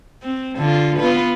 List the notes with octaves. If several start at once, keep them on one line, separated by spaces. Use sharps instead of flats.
C4
D3 F4
B3 F4 B4